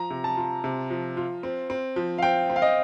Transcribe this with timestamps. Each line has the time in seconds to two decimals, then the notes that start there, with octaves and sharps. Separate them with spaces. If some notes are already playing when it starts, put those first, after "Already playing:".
Already playing: F3 A#5
0.10 C3
0.24 A5
0.37 F4
0.64 C3
0.90 F3
1.17 F4
1.43 C4
1.70 C4
1.96 F3
2.18 F5
2.23 C4 G5
2.50 C4
2.56 F5
2.62 D#5